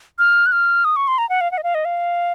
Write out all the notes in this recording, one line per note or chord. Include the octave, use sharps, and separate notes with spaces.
F6
F#6
F6
D#6
C#6
C6
A#5
F#5
F5
F#5
D#5
F5
D#5
F5